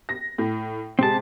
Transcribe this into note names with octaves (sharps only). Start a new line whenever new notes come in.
A#6
A2
C3 G#3 C4 G4 A5